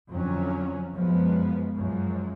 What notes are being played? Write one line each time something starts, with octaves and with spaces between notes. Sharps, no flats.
F2 D3 F#3 C#4
F#2 F3 G#3 B3
F#2 F3 G#3